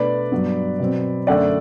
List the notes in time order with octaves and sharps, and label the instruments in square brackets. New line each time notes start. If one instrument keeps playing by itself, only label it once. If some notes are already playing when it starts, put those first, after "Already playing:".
Already playing: [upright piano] B2 A3 D4 B4 D5
G2 F#3 B3
B2 F#3 C4
F#2 D3 A3 D5 F#5